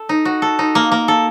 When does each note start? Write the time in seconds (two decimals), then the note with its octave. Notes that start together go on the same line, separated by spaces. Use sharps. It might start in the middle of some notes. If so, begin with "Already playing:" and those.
Already playing: A4
0.09 D#4
0.25 F#4
0.42 A4
0.59 D#4
0.75 A#3
0.92 A#3
1.08 A4